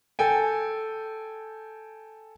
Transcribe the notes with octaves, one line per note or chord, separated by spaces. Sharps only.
A4 G5 G#5